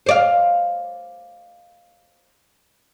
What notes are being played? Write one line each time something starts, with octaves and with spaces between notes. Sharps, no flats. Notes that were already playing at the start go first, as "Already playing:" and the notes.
C5 D5 F5